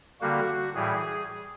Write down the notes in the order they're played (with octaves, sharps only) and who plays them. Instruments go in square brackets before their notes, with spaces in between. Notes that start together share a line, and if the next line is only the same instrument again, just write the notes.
[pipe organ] D3 G3 A#3 F#4
A2 E3 G3 G#4